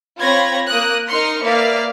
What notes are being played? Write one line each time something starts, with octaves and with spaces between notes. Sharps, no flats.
C4 F4 C#5 B5 G#6 A#6
A#3 A#4 D#6 F#6
D#4 A#4 C6 F6 C#7
A#3 B4 D5 E5 F5